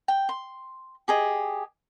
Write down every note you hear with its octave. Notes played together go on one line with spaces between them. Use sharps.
G5
C6
G4 G#4 D#5